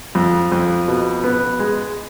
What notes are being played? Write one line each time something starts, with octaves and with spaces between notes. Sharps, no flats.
F2
F2
B2
B3
G#3